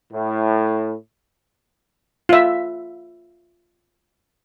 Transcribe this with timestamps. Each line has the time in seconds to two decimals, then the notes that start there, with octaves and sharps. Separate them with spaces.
0.12 A2
2.29 F4 E5